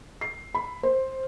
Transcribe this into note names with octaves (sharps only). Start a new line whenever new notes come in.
C7
B5
C5